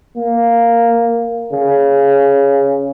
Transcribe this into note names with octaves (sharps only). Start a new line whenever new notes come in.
A#3
C#3